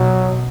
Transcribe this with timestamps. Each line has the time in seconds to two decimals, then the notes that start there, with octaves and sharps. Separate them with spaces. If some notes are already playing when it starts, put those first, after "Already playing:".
Already playing: B2 F#3